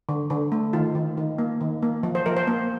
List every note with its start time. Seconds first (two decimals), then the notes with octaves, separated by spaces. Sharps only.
0.09 D3
0.30 D3
0.52 A3
0.73 D#3 F4
0.95 D#3
1.17 D#3
1.38 A#3
1.61 D#3
1.82 A#3
2.03 F3
2.15 C5
2.26 F3 A#4
2.37 C5
2.47 A#3